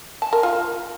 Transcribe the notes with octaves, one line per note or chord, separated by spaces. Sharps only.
A5
A#4
F4